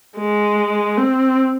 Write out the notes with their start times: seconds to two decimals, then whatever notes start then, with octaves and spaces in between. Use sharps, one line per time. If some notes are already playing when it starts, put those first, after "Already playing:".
0.18 G#3
0.97 C4